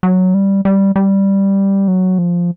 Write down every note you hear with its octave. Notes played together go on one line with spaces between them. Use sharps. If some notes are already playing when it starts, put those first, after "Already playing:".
F#3
G3
G3
G3
F#3
F3